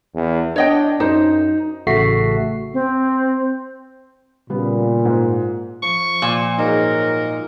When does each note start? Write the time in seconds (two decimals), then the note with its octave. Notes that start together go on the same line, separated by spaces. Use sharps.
0.14 E2
0.56 D4 C#5 D#5 G5
1.00 F#2 D#4 C5
1.87 A1 C#3 A3 F#4 B6 C7
2.74 C4
4.50 A#2 C#3 G3 B3
5.05 G#2
5.83 F3 C#6
6.22 A#2
6.59 G#2 F#3 D#4 A#4 C6